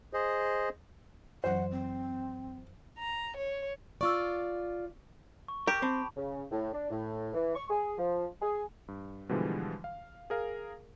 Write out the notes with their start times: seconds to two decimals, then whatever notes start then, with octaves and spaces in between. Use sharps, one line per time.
0.13 G#4 C5 D#5
1.44 F#2 E3 F#3 C5 F#5
1.71 C4
2.99 A#5
3.37 C#5
4.01 F4 D5 C#6 E6
5.48 C#6
5.67 G4 A#4
5.82 C4 A5 B5
6.17 C#3
6.51 A2
6.73 D4
6.90 A2
7.34 E3
7.55 C#6
7.70 G#4
7.97 F3
8.42 G#4
8.88 G2
9.29 B2 D3 E3 F3 G3 G#3
9.84 F5
10.30 G#4 A#4 F5